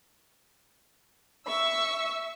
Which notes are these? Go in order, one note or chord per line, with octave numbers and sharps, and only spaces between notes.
E5 C#6 E6